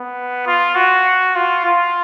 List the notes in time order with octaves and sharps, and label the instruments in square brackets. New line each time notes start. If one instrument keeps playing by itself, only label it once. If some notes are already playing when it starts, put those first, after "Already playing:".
Already playing: [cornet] B3
F4
F#4
F4
F4